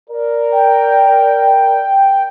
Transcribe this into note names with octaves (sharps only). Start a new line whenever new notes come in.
A#4 D5
G5